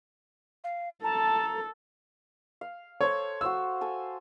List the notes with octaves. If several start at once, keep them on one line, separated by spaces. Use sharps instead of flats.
F5
A4 A5 A#5
F5
A4 C5 C#5
F#4 C5 F5 E6
A4 G#5